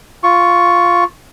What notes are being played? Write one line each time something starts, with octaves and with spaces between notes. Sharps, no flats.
F4 C#6